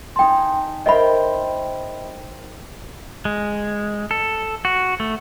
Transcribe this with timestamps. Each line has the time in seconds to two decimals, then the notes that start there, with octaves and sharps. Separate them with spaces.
0.16 D#4 G#4 G5 A5 C6
0.86 A#4 C5 D#5 E5 G5 B5
3.25 G#3
4.11 A4
4.65 F#4
5.00 A3